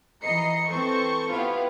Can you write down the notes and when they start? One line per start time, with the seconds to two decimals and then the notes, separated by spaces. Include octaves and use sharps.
0.23 E3 D#5 A#5 C7 C#7
0.68 E3 C4 A4 C5 C#6
1.31 B3 E4 F4 G4 F5